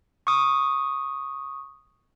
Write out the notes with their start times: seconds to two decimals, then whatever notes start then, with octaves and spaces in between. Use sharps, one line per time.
0.27 C#6 D#6